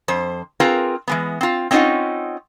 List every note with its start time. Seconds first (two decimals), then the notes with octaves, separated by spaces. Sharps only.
0.08 F2 C5
0.60 C4 F4 G#4 A#4 B4
1.08 E3 G#3 B3
1.41 C4 F4
1.71 C4 C#4 D#4 F4 D#5 F#5